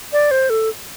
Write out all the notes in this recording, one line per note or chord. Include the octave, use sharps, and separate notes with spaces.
D5
C5
A4